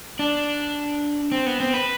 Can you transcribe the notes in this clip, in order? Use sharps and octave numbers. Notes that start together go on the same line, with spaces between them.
D4
C4
B3
C4
B4